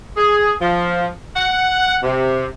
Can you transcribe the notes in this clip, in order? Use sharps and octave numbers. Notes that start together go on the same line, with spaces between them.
G#4
F3
F#5
C3